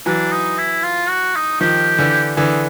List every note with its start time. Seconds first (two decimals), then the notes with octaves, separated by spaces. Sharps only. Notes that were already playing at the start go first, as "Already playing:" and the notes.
0.06 E3 F#3 D4
0.32 D#4
0.58 E4
0.83 F4
1.09 F#4
1.35 D#4
1.60 D#3 F3 G4
1.98 D3 E3
2.37 D3 E3 G#4